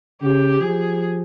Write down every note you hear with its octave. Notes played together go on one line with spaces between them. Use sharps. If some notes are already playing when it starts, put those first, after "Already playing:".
C#3 G4
F3 G#4